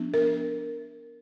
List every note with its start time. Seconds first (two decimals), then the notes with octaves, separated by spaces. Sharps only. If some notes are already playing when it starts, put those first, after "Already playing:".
Already playing: F3 B3 D4
0.14 A#4